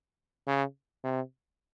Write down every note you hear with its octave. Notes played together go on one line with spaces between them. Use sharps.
C#3
C3